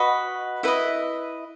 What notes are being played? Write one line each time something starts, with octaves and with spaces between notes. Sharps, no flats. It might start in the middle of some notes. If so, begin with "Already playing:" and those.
Already playing: F#4 B4 D#5 B5
E4 B4 D#5 E5